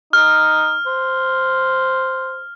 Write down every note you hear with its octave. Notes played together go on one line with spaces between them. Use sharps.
D#4 F6
C5